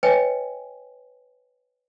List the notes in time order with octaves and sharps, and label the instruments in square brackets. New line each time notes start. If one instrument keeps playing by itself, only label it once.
[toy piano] B4 C#5 D#5 G5 G#5